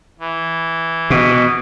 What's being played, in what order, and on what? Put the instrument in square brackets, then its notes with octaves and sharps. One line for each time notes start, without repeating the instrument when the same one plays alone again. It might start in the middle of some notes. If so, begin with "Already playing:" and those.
[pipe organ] E3
[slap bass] B2